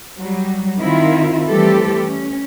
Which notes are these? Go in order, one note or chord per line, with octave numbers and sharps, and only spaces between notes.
F#3 G3
D#3 C4 E4 F4
E3 G3 A3 C4 G4 A4
C#4